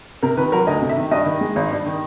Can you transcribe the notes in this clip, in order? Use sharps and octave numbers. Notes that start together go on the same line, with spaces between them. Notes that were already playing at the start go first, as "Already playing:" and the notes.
C3 A#4
D#3 B4
F#3 A#4
D2 D#5
C3
E5
D#3
G2 D#5
D#3
G#3
G#1
G2
D#3